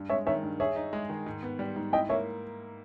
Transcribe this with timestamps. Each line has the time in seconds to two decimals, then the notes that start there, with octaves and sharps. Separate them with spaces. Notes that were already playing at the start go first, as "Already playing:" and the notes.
Already playing: G2
0.09 G#3 C#5 E5
0.26 D#3 C#5 E5
0.43 G2
0.60 G#4 C#5 E5
0.76 D#4
0.93 G#3
1.09 D#3
1.26 G#2
1.43 B3
1.59 G3
1.76 G#2
1.93 E4 D#5 G5
2.09 A#3 C#5 E5